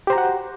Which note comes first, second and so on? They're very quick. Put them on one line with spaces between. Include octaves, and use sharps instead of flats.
G4 C5 A#5 F#4 F#5